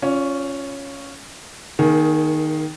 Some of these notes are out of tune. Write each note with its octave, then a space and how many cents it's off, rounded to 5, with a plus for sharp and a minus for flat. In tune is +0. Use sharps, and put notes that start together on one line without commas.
C#4 +0 F4 +0 D5 -35
D#3 +0 A#3 +35 G#4 +15